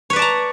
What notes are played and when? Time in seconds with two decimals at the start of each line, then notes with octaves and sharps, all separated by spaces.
0.10 C#5
0.13 B4
0.16 D5
0.19 A5
0.22 A#5